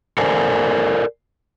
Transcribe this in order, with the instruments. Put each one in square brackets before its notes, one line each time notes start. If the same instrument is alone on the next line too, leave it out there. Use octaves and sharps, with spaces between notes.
[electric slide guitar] A4 A#4 C5 D5 G#5